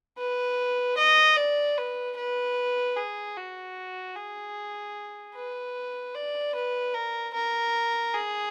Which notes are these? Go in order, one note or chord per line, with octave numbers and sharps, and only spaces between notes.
B4
D#5
D5
B4
B4
G#4
F#4
G#4
B4
D5
B4
A#4
A#4
G#4